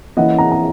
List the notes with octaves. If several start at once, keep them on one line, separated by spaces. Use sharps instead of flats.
E3 A#3 C#4 E4 D#5 F#5
F#5 A#5
A#5